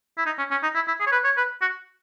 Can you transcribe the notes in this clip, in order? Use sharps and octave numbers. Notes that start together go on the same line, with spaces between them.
E4
D#4
C#4
C#4
D#4
E4
E4
G#4
C#5
B4
C#5
B4
F#4